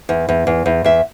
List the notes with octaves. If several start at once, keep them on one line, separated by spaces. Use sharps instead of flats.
E2
E2
E2
E2
E2 E5